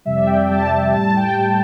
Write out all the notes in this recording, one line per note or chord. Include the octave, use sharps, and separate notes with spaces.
F2 C3 G3 E5
D5
G5
G5
F2 C3 G3 A5
A2 G3 A5
G5
A2 G3